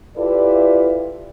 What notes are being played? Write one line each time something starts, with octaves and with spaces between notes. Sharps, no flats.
E4 F4 G4 A4 B4 D5